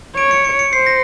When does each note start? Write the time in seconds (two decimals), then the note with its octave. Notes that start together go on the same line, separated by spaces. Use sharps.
0.16 C#5 D7
0.31 C#7
0.44 C#7
0.59 C#7
0.72 C5 C7
0.86 A#6